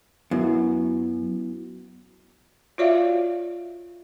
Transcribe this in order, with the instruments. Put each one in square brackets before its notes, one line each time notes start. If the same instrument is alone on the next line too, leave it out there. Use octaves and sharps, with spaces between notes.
[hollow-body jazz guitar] F#2 [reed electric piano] B3 E4 F#4
[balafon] F4 F#4 C#5 D5 E5 F5